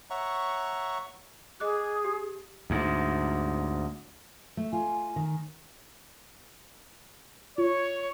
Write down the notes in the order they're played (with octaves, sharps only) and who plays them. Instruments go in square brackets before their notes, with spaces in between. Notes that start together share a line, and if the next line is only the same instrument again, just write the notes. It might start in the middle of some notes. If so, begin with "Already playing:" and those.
[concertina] C#5 E5 F#5 A#5 C#6
[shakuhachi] G#4 [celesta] D#5 D6 F#6
[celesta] G4
[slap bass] D2 G#2
[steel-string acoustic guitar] A3
[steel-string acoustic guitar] F4 [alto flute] G#5
[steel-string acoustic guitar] D#3
[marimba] F4 [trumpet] C#5